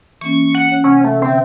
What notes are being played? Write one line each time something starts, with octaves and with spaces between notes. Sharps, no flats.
E3 A#3 C#4 C#6
F#5
C#4 C#5
C3 C#4 F#5
C3 A3
D3 C4 E5